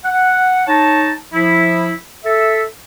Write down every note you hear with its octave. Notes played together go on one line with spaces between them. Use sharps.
F#5
D#4 C#5 A5
F3 E4
A4 E5